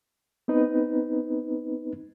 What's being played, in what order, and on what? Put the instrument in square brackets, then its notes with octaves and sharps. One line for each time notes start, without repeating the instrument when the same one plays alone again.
[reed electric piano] B3 C4 D#4 B4